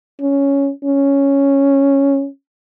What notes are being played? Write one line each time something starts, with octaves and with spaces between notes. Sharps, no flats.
C#4
C#4